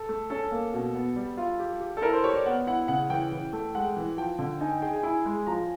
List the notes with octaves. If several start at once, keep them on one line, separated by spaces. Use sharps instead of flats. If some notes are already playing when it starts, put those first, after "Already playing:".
Already playing: A4
A3
C#4 A4
A#3
B2
B3
G3
F4
G4
G4
A4
E4 A#4
C5
G4 C#5
D5
B3 F#5
E4 F#5
C#3 F#5
E3 G5
E3
A3
G#3 F#5
E3
F3 G5
D3
D#4 G#5
G5
G#4 G5
G#5
E4 G#5
G#3
F3 A#5